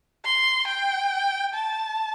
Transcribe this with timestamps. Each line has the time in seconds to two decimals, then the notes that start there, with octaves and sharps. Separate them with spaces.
0.25 C6
0.67 G5
1.54 A5